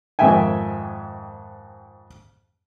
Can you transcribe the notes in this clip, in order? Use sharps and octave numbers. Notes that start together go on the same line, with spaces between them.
F2 G#2 D#3 E5 G5 G#5